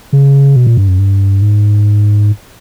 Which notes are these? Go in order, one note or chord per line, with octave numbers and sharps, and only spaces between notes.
C#3
B2
A#2
G2
F#2
G2
G#2